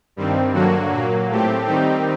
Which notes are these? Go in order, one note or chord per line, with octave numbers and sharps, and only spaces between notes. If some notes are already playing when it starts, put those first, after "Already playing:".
G2 D#3 G3 C4
G2 D3 F#3 A#3 F#4
A#2 F#3 A#3
A2 A3 C4 G4
D#3 G3 C4 D#4 G4